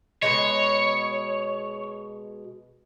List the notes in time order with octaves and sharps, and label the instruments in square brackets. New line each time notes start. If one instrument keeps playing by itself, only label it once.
[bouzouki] B2 E3 G#3 [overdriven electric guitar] C#5